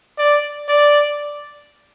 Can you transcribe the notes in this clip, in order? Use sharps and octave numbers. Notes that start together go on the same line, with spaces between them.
D5
D5